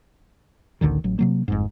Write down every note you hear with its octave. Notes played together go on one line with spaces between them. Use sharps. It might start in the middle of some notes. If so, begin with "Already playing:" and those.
A1 D2 D3 D#3
A1 F#3
C3 F#3 A#3
G1 F2 G#2